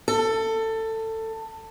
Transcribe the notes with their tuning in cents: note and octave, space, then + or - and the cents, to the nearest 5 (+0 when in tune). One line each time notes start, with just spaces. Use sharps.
A4 +20